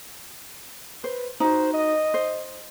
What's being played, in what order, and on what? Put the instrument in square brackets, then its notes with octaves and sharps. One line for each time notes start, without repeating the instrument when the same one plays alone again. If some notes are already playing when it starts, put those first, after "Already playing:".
[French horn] B4 [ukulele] C5
[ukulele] D#4 E4 F#4 [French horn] C5
[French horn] D#5
[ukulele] C5